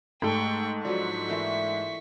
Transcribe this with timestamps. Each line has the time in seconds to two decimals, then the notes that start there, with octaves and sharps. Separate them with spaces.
0.22 G#2 G3 A3 A4 G5 C#6
0.85 F3 F#3 D4 D5 C#6 B6
1.28 E3 A3 A#3